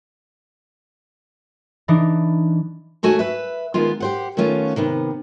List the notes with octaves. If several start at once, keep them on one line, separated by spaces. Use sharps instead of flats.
E3 D4 D#4
D#2 A3 F#4 G#5
B4 E5
D#3 G#3 B3 F4
G4 C5 F#5
D#3 A3 B3 C#4 F4
C3 D#3 B3